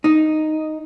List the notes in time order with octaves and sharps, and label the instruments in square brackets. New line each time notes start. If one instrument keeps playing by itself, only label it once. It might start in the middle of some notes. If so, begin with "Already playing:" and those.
[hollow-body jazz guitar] D#4